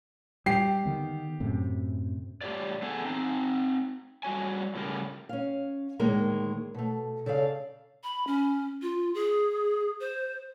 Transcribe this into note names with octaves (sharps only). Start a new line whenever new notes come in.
G3 G4 C7
D3 D#3 B3
F#2 A2 C3
A2 G4 G#4 C#5 D5
A3 B3 G#4 A4
C4 D#4
G3 F#4 C#5 G#5
A2 C#3 G3 A#4
C#4 F5
D2 A2 D#3 G#3 A#3 A#4
B2 A3
C#3 A4 D5 F5
B5
C#4
F4
G#4
C5